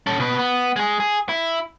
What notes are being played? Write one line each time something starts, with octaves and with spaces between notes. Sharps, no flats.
C#4 A4
B2 B4
B3
G#3 G#4
G#4
E4